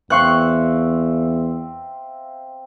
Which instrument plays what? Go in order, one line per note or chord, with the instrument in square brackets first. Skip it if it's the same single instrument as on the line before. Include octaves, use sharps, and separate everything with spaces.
[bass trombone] E2 [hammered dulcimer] C4 E5 F5 [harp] C6 C#6 F#6